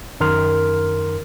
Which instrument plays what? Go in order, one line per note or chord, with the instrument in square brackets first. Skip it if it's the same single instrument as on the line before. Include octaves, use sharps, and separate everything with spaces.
[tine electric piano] F#2 D#3 A#4 C6 F6